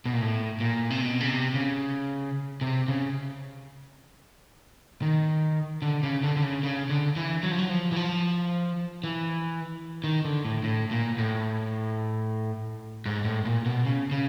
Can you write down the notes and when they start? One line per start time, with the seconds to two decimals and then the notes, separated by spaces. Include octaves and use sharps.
0.06 B2
0.13 A#2
0.21 A2
0.60 A#2
0.90 C3
1.01 B2
1.21 C#3
1.28 C3
1.54 C#3
2.61 C3
2.88 C#3
5.02 D#3
5.82 D3
6.03 C#3
6.23 D3
6.36 D3
6.43 C#3
6.63 C#3
6.89 D3
7.16 E3
7.43 F#3
7.51 F3
7.59 F#3
7.69 F3
7.92 E3
7.96 F3
9.04 E3
10.04 D#3
10.25 D3
10.45 A2
10.64 A2
10.91 A#2
11.18 A2
13.06 G#2
13.25 A2
13.45 A#2
13.66 B2
13.85 C#3
14.11 C#3